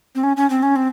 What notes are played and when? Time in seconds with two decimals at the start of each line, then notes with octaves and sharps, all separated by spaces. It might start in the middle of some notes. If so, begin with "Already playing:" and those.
0.15 C4
0.23 C#4
0.37 C#4
0.50 C4
0.63 C#4
0.76 C4